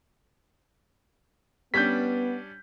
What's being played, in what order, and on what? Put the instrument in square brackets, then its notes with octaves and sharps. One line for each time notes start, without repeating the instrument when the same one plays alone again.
[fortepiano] G3 C#4 D4 [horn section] B3 [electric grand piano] G6 B6